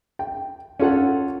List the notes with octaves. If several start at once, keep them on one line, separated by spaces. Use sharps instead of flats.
G5
C#4 F4 A4 C#5 F#5